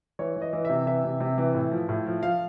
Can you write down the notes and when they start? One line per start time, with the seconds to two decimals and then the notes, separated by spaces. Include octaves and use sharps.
0.19 E3 C#5
0.36 E3
0.42 D#5
0.53 E3
0.65 C3 E5
0.86 E3 E5
1.04 C3
1.20 C3
1.38 E3
1.55 A2
1.72 F3
1.89 A2
2.06 F3
2.23 F3 F5